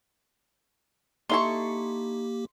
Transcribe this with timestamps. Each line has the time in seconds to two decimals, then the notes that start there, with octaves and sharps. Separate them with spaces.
1.29 A#3 D#4 E4 G4 A4 C6 C#6